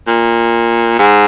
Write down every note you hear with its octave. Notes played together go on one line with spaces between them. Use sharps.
A#2
G#2